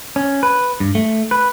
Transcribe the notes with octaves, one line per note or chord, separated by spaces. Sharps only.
C#4
B4
G2
A3
B4